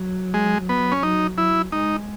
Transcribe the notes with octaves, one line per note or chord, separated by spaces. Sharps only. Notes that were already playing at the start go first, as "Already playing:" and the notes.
Already playing: F#3
G#3
B3
C#4
F#3 D#4
F#3 E4
G#3 D#4